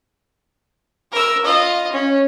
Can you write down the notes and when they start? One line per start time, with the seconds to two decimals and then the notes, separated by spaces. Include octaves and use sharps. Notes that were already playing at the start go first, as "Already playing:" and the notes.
1.12 A#4 E6
1.45 F4 D#5
1.93 C#4